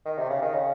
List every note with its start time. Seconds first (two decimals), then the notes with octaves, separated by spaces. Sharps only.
0.06 D#3
0.18 C3
0.30 C#3
0.42 D#3
0.54 C#3